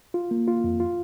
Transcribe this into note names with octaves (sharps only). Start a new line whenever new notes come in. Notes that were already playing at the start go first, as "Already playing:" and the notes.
F4
A#3
F4
F2
F4